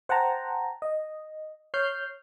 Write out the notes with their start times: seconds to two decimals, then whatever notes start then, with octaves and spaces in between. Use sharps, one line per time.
0.09 C5 F#5 G5 A5 A#5
0.82 D#5
1.74 C#5 F6 G6 C7